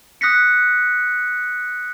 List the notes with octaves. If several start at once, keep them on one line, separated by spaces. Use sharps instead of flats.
D#6 F#6 A#6 B6 C#7